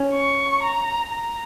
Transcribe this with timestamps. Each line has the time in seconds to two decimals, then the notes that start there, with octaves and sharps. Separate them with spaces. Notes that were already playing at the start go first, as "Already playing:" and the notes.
Already playing: C#4
0.15 C#6
0.63 A#5
1.11 A#5